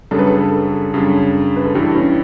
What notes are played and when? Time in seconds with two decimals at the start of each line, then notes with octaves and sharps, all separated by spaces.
0.11 F#2 C#3 G3 D4 A4
0.19 B4
0.27 A4
0.94 F#2 C#3 G3 D4
1.56 B4
1.65 A4
1.75 G2 E3 G3 G4
1.96 C#4